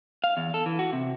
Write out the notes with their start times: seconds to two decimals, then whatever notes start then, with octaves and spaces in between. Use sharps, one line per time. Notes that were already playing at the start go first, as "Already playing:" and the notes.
0.24 F5
0.37 E2
0.54 A4
0.66 E3
0.79 F#4
0.93 C3